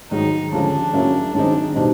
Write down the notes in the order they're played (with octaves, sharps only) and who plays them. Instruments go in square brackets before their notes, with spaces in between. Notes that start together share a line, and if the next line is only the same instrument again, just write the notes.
[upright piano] G#2 D#3 F#3 [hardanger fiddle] D#4
[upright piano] D#2 D3 F3 G#3 C#4 [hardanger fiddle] D4
[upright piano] C#3 F#3 A#3 C#4 E4
[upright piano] F#2 D#3 G#3 C4 D#4 [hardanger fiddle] D4
[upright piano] B2 G3 C4 D#4